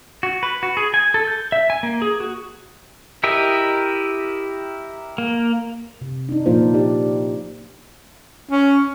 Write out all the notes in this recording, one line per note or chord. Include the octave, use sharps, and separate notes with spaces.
F#4
B4
F#4
G#4
G#5
A4
G6
E5
G#5
A#3
G#4
F#4
E4 G4 A#4 D#5 E5
A#3
C3
D4 D#4
A#2 F3 A#3 D4 F4 C5
D#4 G4 D5
C#4